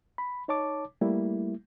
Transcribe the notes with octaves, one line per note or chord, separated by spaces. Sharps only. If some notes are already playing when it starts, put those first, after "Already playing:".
B5
D#4 C#5 A5 D6
G3 A3 A#3 E4